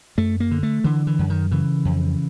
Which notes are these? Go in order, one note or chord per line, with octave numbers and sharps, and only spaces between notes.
F#2 A3
A#3
D3
A3
D3 E3
E3
F#2
D#3
C#3 E3
F2